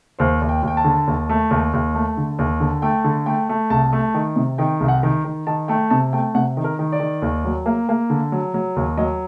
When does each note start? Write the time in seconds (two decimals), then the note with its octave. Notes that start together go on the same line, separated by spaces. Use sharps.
0.19 D#2 C5
0.41 D#2
0.49 G5
0.63 D#2 G5
0.77 A5
0.84 D3
1.07 D#2
1.29 A3
1.51 D#2
1.73 D#2
1.95 A3
2.17 D3
2.39 D#2
2.60 D3
2.82 A3 G5
3.04 D3
3.26 A3 G5
3.49 A3
3.70 C2 A5
3.93 A3
4.14 D#3
4.36 C3
4.58 D#3 G5
4.80 C2
4.88 F#5
5.03 D#3
5.24 D#3
5.47 D#3 A5
5.68 A3 G5
5.90 C3 A5
6.13 A3 G5
6.35 C3 F#5
6.57 D#3
6.64 A#4
6.79 D#3
6.92 D5
7.00 D#3
7.22 D#2
7.45 F#3
7.66 A#3
7.89 A#3
8.10 D3
8.32 F#3
8.54 F#3
8.76 D#2
8.97 F#3 D#5